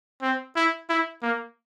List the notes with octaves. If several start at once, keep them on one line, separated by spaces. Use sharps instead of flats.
C4
E4
E4
A#3